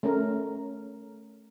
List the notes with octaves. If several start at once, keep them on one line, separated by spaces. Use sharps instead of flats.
A3 C#4 A#4